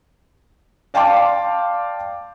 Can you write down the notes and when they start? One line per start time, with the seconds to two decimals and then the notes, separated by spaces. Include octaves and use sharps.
0.94 D5 F5 G5 A5 C6 D6